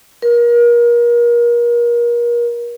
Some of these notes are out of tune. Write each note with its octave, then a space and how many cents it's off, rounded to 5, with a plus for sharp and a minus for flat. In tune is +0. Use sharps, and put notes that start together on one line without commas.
A#4 +30